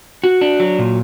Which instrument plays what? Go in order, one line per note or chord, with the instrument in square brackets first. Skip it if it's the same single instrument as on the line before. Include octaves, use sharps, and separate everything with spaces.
[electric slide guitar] F#4
D4
F#3
A#2